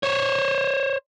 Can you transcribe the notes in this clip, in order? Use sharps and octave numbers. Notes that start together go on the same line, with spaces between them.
C5 C#5